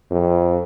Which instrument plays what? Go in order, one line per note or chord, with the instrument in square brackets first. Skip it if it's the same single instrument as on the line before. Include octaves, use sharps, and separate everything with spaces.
[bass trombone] F2